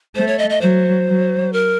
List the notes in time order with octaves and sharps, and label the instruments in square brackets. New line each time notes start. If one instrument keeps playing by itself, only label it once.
[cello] A3 [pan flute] C5
[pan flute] C#5
D#5
D#5
[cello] F#3 [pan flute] C5
[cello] F#3
[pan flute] A#4